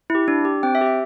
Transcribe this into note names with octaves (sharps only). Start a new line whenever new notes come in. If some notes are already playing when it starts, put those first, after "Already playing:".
E4
G4
D4
G4
C4 G5
E5
G4
E5